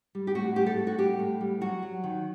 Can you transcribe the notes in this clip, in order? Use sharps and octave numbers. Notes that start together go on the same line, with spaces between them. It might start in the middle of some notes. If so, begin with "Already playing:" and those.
G3
G4
A2 F#4
G3 G4
A4
A2
F#4
G3 G4
A2
G3
F#3 F#4
F#3
D#3